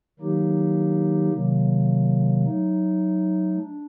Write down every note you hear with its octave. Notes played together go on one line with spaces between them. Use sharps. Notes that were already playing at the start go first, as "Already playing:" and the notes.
D#3 F#3 A#3 D#4 G4
C3 D#3 F#3 A#3
F#3 A3 D#4
D4